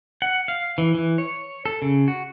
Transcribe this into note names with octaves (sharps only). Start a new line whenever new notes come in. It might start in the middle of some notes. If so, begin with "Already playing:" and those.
F#5
F5
E3
E3
C#5
A4
C#3
F#4